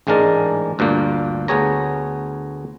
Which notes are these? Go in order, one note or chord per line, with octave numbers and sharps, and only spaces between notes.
A1 G#2 G#3 D4 A#4 A5
D2 G2 A#2 A#3
D2 B3 G#4 C#5 A#5